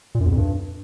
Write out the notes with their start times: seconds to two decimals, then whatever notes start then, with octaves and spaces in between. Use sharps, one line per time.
0.15 A#2
0.20 F#2
0.26 E2
0.32 F2
0.37 G2